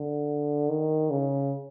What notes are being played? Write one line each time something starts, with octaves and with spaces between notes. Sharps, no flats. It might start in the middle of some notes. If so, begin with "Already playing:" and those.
Already playing: D3
D#3
C#3